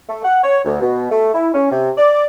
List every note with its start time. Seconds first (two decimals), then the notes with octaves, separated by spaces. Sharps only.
0.09 A3
0.24 F#5
0.43 C#5
0.65 D2
0.82 B2
1.11 A3
1.34 E4
1.54 C#4
1.72 C3
1.97 D5